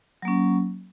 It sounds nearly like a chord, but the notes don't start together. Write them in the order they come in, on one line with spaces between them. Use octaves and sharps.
F#3 A#3 C#4